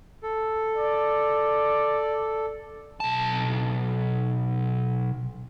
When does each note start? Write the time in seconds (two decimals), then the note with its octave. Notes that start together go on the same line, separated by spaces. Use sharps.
0.23 A4
0.77 D5
3.00 B1 A5